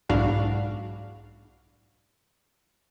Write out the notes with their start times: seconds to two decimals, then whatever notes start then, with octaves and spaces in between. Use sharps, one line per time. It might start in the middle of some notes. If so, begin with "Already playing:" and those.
0.09 B1 G#2 D4 E4 F#4 F5